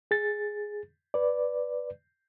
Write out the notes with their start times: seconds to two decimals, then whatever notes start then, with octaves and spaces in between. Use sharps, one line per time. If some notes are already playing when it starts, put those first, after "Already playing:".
0.11 G#4 A6
1.14 B4 D5